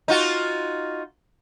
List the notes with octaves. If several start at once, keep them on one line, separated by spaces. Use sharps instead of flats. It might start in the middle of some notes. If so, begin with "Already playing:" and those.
D#4 F4 F#4